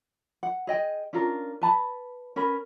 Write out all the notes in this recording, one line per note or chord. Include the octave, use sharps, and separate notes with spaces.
F#5
G#4 D#5 G5
C#4 D4 F4 A#4
B4 A5 B5
C#4 A#4 B4 B5